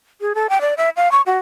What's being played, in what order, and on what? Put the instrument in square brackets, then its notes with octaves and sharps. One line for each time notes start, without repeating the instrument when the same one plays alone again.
[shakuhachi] G#4
A4
G5
D5
E5
F5
C#6
F#4